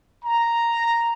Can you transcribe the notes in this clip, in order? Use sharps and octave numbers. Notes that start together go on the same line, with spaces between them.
A#5